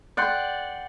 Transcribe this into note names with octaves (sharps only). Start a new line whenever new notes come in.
D5 F#5 G5 C6